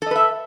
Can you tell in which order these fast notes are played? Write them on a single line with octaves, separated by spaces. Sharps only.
A4 D#5 B4 E5